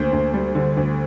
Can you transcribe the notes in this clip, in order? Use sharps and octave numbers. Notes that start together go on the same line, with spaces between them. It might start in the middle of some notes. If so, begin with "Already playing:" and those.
Already playing: D2 A#3 C5
D2
G3
D3
D2